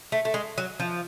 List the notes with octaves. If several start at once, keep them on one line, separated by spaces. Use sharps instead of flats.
A3
A3
G#3
F#3
F3